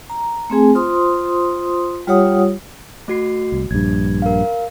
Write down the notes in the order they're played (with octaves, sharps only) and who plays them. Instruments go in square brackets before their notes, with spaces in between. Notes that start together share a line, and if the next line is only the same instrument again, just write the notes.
[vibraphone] A#5
A3 C4 G#4 G#5
F4 C5 C6 D#6
G3 F4 G4 C#5 F#5 D#6
[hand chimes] A3 F#4 C7
[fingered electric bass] C2
[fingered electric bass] A#1 G2 [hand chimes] G#6
[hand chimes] A#4 F5